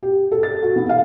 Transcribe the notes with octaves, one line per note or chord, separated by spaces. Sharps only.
G4
A4
A6
F#4
B3
F5